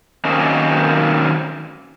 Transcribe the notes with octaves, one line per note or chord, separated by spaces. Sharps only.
D#3 F#3 A#3 C4 C#4 D#4